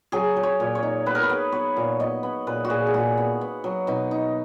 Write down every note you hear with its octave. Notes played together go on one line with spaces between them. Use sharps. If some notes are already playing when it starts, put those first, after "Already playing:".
F#3 G#4
F#3
C#5
A#2
C#5
D#4
B3 B4
A#4
B4
B3
B3 C#5
A#2
B3 D#5
B3
A#2 B4
F#4
A#2 G#4
G#4
A#2 F#4
B3
B3
F#3
B2 D#4
D#4